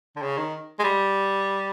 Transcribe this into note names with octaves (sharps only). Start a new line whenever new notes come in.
D3
C#3
D#3
G#3
G3